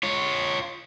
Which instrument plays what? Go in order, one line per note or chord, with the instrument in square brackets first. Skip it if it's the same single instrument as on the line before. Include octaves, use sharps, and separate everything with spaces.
[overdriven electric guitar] F4 C#5